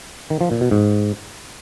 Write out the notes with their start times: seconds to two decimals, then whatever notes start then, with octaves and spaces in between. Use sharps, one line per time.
0.30 D#3
0.41 F3
0.51 A#2
0.61 B2
0.71 G#2